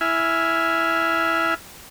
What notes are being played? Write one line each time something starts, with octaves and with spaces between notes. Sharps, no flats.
E4 E5 G#5 F6